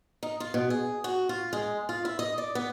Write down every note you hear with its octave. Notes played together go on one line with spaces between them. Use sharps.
D#4
F4
B2
G#4
F#4
F4
G#3
F4
E4
D#5
D5
B3